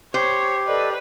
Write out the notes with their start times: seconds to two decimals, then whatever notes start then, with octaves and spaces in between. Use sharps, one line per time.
0.14 G4 C5 C#5
0.67 A4 B4 D5 D#5